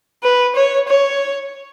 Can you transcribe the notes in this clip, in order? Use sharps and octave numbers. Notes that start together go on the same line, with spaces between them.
B4
C#5
C#5